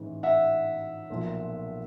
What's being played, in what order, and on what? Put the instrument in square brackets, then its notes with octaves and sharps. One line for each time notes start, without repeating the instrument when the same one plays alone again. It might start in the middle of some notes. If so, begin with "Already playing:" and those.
Already playing: [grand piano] A1 G#2 E3
E5 F#5
B1 A#2 F3